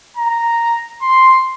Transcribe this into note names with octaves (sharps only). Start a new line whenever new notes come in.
A#5
C6